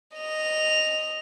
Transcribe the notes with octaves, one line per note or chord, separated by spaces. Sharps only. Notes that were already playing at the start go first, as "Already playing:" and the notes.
D#5 F7